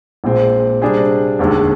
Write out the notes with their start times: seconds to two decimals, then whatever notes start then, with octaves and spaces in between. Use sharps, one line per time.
0.24 A#1 A#2 G#3 C4
0.82 C3 G3 D4 G#4 C5
1.39 F1 D#2 D3 G#3